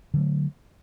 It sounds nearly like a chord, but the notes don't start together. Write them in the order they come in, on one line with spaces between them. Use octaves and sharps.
D3 F#3 A3